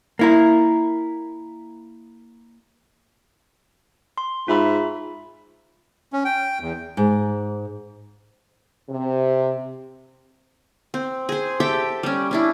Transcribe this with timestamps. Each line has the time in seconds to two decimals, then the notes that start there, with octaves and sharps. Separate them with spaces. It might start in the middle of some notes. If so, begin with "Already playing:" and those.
0.19 A#3 E4 A#4
4.18 C6
4.48 G#2 F4 E5 B5
6.13 C#4
6.25 G5
6.61 E2
6.97 G#2
8.89 C3
10.94 C4
11.29 G#4 C5
11.60 G4 A4 E5 G5
12.03 G3 C#4
12.31 C#4 D4 E4